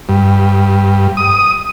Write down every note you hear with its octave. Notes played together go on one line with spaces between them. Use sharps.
G2
D#6